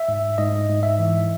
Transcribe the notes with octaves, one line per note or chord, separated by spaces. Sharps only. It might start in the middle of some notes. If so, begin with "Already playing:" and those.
Already playing: E5
G#2
G#2 D#5
G#2
E5
E3